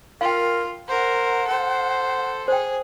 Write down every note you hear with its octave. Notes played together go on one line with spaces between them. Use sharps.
F4 A#4 F5 G5
A#4 C5 F#5
A4 C5
G#4 C5 G5